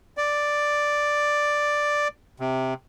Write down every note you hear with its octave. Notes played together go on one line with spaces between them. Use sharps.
D5
C3